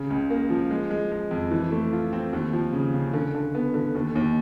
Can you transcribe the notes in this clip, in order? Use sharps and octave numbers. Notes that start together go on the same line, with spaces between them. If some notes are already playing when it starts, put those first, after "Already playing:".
Already playing: C#3
C#2
A#3
F3
G#3
G#3
G#3
F2
E3
A3
F4
C4
D#2
F3
C#3
C#3
D3
D3
B3
D3
D#2
D#2